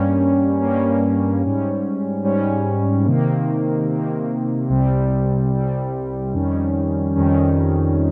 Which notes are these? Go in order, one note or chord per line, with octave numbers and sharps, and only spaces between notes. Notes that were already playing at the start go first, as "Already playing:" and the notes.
Already playing: G2 G3 A#3 C#4
G2 G3 A#3 C#4
G#2 G3 C#4
G#2 G3 C#4
C3 D#3 A#3
C3 D#3 A#3
C2 C3 G3
C2 C3 G3
F2 D#3 G3 C#4
F2 D#3 G3 C#4